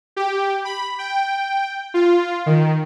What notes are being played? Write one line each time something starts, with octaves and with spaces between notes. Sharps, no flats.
G4
B5
G5
F4
D#3